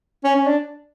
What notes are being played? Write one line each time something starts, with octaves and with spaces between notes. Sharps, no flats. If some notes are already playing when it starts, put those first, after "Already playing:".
C#4
C#4
D4